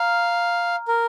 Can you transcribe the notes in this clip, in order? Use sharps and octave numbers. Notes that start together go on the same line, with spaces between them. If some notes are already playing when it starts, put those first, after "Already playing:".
Already playing: F5 A#5 F6
A#4